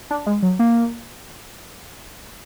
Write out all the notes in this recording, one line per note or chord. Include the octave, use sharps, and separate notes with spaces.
D4
G#3
F#3
A#3